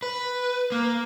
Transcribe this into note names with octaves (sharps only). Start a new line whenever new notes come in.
B4
A#3